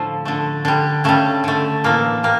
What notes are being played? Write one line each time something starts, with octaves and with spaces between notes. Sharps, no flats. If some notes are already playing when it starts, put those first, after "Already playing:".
Already playing: A2 D3 F3 A3
D3 A3
D3 G3
C#3 G3 A3
D3 A3
A2 E3 A3 A#3
G3 A#3